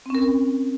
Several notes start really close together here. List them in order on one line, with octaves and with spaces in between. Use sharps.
C4 C#4 A#4